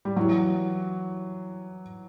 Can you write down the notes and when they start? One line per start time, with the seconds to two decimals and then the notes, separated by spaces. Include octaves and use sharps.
0.05 G3
0.16 E3 F#3